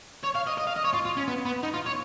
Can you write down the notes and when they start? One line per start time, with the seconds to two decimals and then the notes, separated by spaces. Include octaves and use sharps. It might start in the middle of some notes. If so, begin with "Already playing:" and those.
0.24 C#5
0.36 F5
0.47 D#5
0.58 D#5
0.67 F5
0.76 D#5
0.84 C#5
0.94 F4
1.05 F4
1.17 C#4
1.28 B3
1.45 B3
1.63 D#4
1.74 F4
1.86 C#5